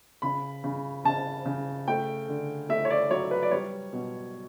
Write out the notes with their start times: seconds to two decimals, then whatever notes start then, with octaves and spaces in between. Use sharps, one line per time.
0.22 C#3 B5
0.64 C#3
1.05 C#3 A5
1.45 C#3
1.88 A3 G5
2.28 D3
2.69 A3 E5
2.85 C#5
2.90 D5
3.11 F#3 C#5
3.31 B4
3.43 D5
3.51 G3 C#5
3.93 B2